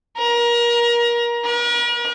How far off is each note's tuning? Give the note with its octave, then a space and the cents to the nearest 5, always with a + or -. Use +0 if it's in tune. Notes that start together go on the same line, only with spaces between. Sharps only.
A#4 +25
A#4 +45